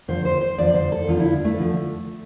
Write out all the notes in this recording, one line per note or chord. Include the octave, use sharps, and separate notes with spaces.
E2 D3 F3 C5
C5
C5
E2 D3 F3 D5
C5
A4
E2 D3 F3 F4
E4
D4
A3
E2 D3 F3